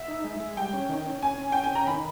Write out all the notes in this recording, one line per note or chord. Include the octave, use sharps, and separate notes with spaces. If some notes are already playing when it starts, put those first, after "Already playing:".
Already playing: E5
D#4
G#3
G#3
G3 G5
C#4
D#3
C#4
C#4 G#5
C#4
C#4 G5
G#5
C#4 A#5
D#3 B5